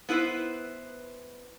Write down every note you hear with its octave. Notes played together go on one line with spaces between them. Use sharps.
B3 E4 B4 C5